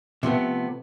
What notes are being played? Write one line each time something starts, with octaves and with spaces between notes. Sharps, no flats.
C3 F3 A3 B3